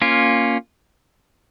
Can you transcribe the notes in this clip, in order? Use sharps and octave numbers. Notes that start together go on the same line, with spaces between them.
A#3 C#4 F4